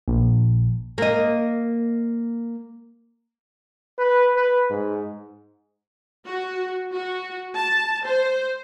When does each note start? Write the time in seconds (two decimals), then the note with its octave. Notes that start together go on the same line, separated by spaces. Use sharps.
0.08 A#1
0.98 A#3 D#5
3.98 B4
4.36 B4
4.70 G#2
6.25 F#4
6.93 F#4
7.56 A5
8.07 C5